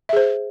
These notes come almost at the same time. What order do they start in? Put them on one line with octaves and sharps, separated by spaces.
E5 G#4 C5